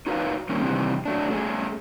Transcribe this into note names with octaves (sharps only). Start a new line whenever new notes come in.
D#4 F#4 A#4 B4 C#5 F5
D#3 G3 A#3 C#4
C3 D#3 E3 G3
F#3 A3 D4
A3 C#4 D4 G#4